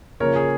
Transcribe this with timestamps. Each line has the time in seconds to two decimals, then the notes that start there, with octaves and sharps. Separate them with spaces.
0.20 C#3 F3 A#3 C#4 A#4 C#5
0.36 G#4